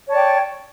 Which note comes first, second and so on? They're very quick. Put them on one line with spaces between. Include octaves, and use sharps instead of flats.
C#5 A5 D5 G5